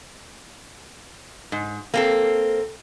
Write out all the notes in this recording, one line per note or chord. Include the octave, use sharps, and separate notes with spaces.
G#2
A#3 C4 A4